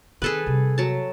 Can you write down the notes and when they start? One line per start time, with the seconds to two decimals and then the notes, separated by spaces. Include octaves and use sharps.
0.22 D#3 C4 G#4 A4 B4
0.46 C3 G3
0.78 F#3 A5